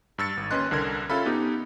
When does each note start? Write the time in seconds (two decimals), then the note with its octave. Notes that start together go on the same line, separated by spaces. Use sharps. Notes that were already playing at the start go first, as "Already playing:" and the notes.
0.18 G2 E6 A6 C#7
0.37 G#1
0.51 D#2 C#4 B4 D#5 C6 F#6
0.71 C2 D3 A#4 G#6
1.10 C#4 F4 A4 E5 F5 B5
1.26 B3 D#4 G4